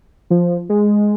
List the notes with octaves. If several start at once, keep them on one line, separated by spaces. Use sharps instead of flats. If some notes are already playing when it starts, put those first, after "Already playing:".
F3
G#3